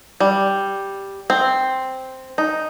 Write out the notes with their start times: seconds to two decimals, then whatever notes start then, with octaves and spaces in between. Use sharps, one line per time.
0.20 G3
1.30 C4
2.38 D#4